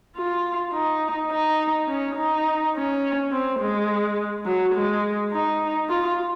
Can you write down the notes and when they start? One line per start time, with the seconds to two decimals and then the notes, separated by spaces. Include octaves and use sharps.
0.17 F4
0.73 D#4
1.31 D#4
1.88 C#4
2.17 D#4
2.75 C#4
3.32 C4
3.60 G#3
4.45 F#3
4.75 G#3
5.31 D#4
5.89 F4